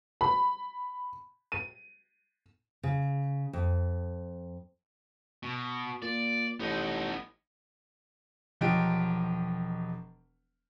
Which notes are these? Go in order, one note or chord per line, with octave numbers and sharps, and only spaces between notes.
B5
D#7
C#3
F2
B2
A#2 D5
A1 B3 D#4
E1 F3 F#3 G4 D#5 D7